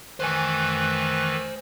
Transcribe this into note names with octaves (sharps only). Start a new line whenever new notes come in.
D#3 E3 B4 C5 G#5